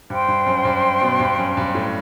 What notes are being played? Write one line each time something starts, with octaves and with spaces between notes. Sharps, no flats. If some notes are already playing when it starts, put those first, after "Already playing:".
G2 C5 G5 C6
G2
F#2
G2
B2
G2
F#2
G2
A2